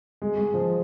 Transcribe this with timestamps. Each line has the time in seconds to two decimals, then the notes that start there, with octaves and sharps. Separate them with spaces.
0.22 G#3
0.38 G#3
0.54 F3